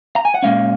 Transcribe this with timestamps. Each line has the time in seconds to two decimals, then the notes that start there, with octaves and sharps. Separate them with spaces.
0.16 A#5
0.25 G#5
0.35 F#5
0.43 A#2 G#3 C#4 F5